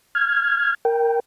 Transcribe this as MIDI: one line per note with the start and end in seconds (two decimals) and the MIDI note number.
0.15 0.74 89
0.15 0.74 92
0.85 1.20 70
0.85 1.20 79